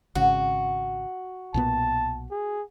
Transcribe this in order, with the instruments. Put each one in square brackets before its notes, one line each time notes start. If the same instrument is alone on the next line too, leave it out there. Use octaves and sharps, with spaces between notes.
[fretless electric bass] G#1 C#3 [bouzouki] F#4
[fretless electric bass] B1 A#2 B3 [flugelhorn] A5
[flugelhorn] G#4